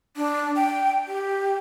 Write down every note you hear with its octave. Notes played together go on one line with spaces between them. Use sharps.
D4
G5
G4